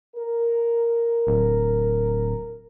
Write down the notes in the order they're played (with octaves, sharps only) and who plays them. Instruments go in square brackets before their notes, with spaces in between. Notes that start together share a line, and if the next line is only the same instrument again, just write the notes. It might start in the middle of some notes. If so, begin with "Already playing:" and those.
[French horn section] A#4
[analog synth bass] D1